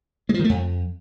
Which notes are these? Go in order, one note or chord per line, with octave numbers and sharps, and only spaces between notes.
G#3
F3
D#3
A3
F2